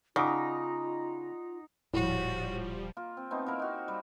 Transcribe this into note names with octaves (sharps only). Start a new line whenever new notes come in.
C#3 D#4 F4 F#5 D6
D#1 A2 F3 G3 F#4
A#3 F4
C4
A3 B3 C4 D#4
A#3 E4 A#4 F5
D#4 F#4
G3